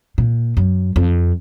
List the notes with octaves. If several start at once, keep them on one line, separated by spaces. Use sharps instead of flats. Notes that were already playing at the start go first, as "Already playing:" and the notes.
A#2
F#2
F2